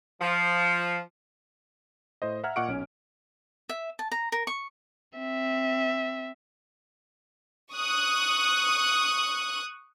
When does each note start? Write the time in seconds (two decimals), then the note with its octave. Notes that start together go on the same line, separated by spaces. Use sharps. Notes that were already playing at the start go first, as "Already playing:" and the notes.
0.20 F3
2.22 A2 C5 D#5
2.44 E5 F#5 A#5 F6 G#6
2.56 A#2 D#5 F#5 C#6 D6 D7
2.68 B1 C#4
3.69 E5
3.99 A5
4.12 A#5
4.32 A#4
4.47 C#6
5.18 C4 E5
7.74 C#6 D#6 F#6